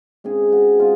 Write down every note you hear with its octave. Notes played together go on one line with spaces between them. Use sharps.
C#3 G#3 C4 D#4 G#4
F#4
G#3 C4 D#4 F4